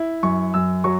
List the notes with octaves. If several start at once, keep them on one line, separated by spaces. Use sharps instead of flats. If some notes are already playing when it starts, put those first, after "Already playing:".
Already playing: E4
F#2 C#6
F#2 E6
F#3 C#6